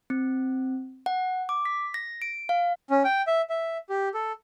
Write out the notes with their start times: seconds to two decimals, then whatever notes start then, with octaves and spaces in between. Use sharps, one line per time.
0.10 C4
1.06 F#5
1.49 D6
1.65 B6
1.94 A#6
2.22 D7
2.49 F5
2.90 C#4
3.05 G5
3.27 E5
3.50 E5
3.89 G4
4.14 A4